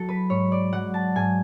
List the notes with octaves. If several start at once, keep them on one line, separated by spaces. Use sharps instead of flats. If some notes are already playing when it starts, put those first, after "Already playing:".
Already playing: F#3 A4
B4
G#2 C#5
D5
F#3 F#5
A5
G#2 G#5